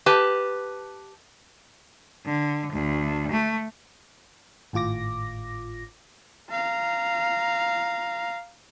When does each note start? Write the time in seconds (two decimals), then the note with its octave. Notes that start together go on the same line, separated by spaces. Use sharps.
0.06 G4 B4 A5
2.25 D3
2.73 D2
3.32 A3
4.73 G#1 A2 F4 D6 A#6
6.51 F5 A#5